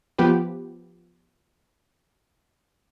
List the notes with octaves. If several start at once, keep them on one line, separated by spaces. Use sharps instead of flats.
F3 B3 G4 B4